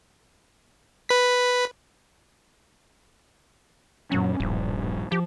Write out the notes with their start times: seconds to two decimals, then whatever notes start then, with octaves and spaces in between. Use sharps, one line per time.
1.09 B4 B6
4.12 F#2 A#2 F#3 C#4
4.40 D1 A#1 G2
5.12 F3 G4